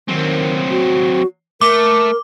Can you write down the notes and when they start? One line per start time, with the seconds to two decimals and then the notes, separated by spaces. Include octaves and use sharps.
0.08 D#3 F#3 C4
0.70 F#4
1.61 A3 A#4 D6